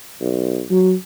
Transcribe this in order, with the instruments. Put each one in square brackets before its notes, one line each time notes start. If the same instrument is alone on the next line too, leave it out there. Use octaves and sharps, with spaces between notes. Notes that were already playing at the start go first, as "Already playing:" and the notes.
[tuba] B1
F#3